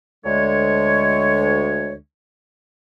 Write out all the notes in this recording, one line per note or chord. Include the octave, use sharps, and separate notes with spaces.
D2 D3 G#3 C#5